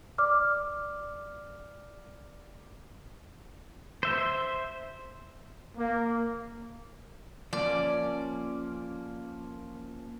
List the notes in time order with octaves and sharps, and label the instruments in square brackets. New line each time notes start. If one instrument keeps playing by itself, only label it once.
[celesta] D5 D6 F6
[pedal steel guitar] C5 E5
[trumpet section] A#3
[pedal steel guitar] F3 A#3 C#4 [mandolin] D5